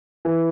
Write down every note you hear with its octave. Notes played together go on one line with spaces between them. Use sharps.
E3